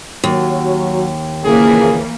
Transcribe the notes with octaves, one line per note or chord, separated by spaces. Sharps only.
D#2 F#3
A#1 C#3 E3 A#3 G#4